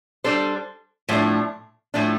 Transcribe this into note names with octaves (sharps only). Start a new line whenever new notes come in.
G3 D4 A4 C5
A2 F3 A3 D4
A2 F3 A3 D4